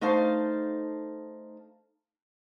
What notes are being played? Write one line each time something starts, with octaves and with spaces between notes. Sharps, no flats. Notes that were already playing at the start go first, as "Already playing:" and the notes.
A3 D#4 C5 F5 A5